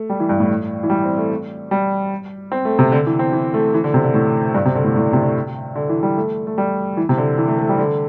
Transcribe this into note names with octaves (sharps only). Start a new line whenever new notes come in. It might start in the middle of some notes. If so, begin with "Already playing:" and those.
Already playing: A3
G3
E3
G2
A2
E3
G3
C4
A3
G3
C4
A3
C3
D3
E3
C4
E3
A3
E3
D3
C3
D3
A2
G2
C3
D3
A2
A2
C3
D3
D3
E3
G3
A3
A3
G3
E3
C3
D3
E3
A3
A3
G3
D3